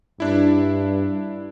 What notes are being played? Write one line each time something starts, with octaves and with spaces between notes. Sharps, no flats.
G2 D4 E4